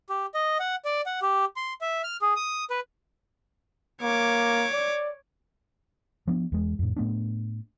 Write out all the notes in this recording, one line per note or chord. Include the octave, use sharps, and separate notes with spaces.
G4
D#5
F#5
D5
F#5
G4
C6
E5
F6
G#4
D#6
B4
A#3 C#5 D6
D5
F3 B3 D4
E2 G#3
F2 A2
A2 A3 B3 D4